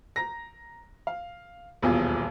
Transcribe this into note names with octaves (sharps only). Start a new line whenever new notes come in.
A#5 A#6
F5
D#1 B1 E2 F4 G#4